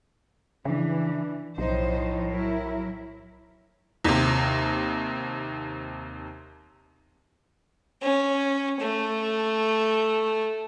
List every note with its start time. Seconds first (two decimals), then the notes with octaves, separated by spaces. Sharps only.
0.65 C#3 E3 D4
1.58 B1 A2 F3 D#4 C5
2.27 F#3 E4 A#4
4.05 D#2 C3
8.02 C#4
8.80 A3